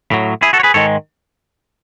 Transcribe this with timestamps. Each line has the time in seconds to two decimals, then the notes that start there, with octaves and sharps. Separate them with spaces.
0.11 A2 F#3
0.42 E4 G#4
0.53 F#4 A4
0.60 C#5
0.63 G#4 B4
0.74 G#2 D#3 G#3 A4 C#5